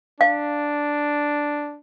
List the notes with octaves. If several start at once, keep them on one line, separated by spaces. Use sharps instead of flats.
D4 F5